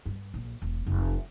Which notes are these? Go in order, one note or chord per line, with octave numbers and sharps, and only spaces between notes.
G2
A#1
E1
F1